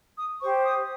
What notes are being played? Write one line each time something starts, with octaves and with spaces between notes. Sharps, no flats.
D#6
G4 C5 C#6
D#6